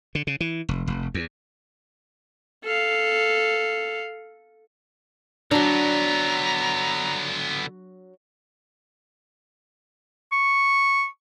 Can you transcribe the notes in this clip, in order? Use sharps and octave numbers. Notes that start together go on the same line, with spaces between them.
D3
C#3
E3
F1
F1
E2
A4 F5
D3 F#3 B3 D4 A#5
C#6